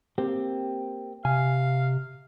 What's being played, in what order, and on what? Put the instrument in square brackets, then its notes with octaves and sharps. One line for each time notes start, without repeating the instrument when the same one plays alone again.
[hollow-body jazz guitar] A#3 C4 G4
[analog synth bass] C3 [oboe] F5 [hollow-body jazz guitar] G#5